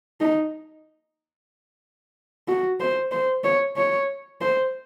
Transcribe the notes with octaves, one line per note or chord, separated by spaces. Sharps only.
D#4
F#4
C5
C5
C#5
C#5
C5